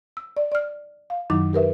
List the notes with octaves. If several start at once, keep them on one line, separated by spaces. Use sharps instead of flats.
E6
D5
D5 F6
F5
F#2 D#3 F#3 D#4 E4 D6
G4 A#4 B4 E5